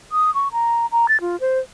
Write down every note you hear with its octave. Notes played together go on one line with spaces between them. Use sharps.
D#6
C#6
A#5
A#5
A6
F4
C5